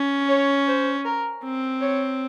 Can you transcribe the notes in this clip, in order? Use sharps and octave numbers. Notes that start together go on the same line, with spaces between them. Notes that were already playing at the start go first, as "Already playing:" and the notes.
Already playing: C#4
C#5
C5
A#4
C4
C#5